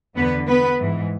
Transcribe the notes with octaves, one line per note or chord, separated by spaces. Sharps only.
E2 D3 B3 B4
B3 B4
G#2 E3